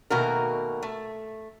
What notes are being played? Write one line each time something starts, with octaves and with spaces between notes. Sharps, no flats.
B2 D#3 A3 A#3 F#4 A#4
A3